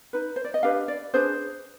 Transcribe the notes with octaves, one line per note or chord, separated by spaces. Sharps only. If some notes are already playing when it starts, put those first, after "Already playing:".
D#4 B4
C5
D5
D#5
D4 G4 B4 F5
D5
D4 G#4 B4 C5